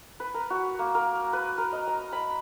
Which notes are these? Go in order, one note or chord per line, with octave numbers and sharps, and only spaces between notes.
B4
A#4
F#4
A#3
A#4
B4
A#4
D#5
A#5
B5